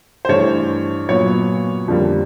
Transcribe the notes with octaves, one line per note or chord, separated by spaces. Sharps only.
C5
G2 E3 A3 C#5
A#2 F#3 B3 C#5
F2 D3 G3 A#3